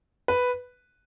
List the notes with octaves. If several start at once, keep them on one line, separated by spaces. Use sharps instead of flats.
B4